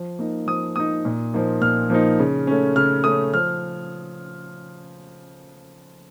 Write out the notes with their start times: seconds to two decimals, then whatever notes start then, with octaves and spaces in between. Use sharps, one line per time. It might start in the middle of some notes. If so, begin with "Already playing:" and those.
Already playing: F3
0.19 A#3 D#4
0.47 F3 D#6
0.76 A#3 D#4 D#6
1.05 A#2
1.34 F3 A#3 D#4
1.61 A#2 F6
1.90 F3 A#3 D#4
2.19 C#3
2.47 A3 C#4
2.76 C#3 F6
3.04 A3 C#4 D#6
3.33 F3 F6